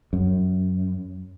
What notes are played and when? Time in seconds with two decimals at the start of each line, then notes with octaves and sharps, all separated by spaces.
0.13 F#2